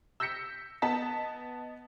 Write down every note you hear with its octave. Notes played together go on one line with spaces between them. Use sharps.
E6 G6 A#6 B6 C#7
B3 D#5 A5 B6